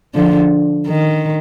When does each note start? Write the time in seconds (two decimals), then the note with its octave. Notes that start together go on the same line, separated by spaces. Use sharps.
0.15 D3 F3
0.88 D#3